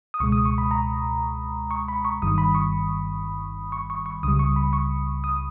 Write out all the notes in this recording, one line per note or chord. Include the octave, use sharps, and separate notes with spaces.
D#6
C#2 B2 G#3 C#6
D#6
C#6
B5
A#5
C#6
B5
C#6
G1 G2 D#3 G3 D#6
B5
C#6
C#6
C#6
C#6
C#2 C#3 G3 D#6
C#6
B5
C#6
D#6